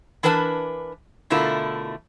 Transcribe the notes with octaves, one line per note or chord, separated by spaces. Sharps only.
E3 D4 A#4 B4 G#5 A5
B2 D3 A3 E4 F4 A#4